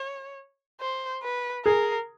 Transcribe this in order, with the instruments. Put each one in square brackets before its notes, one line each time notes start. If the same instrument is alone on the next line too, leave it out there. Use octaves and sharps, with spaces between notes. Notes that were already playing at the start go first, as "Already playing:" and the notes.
Already playing: [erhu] C#5
C5
B4
[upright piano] G#4 [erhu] A#4